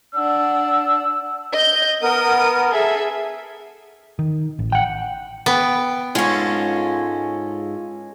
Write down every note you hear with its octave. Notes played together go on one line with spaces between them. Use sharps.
D4 F#5 E6
D#5 G6
B3 A#4 D#6
G#4 A4 E5
D#3
A1
F#5 G5
B3 G5
G#2 G#3 C#4 F4 A4